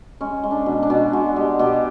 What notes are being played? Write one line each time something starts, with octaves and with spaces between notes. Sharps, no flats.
G#3 C#4
G#3
D4
B2
D4
B2
G#3 F#4
G#3 G4
B2 G4